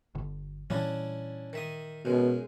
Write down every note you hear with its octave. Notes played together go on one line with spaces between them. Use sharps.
G1 D3
A#2 E3 G3 C#4 D4 E4
D#3 E5 D#6
F#2 B2 G#3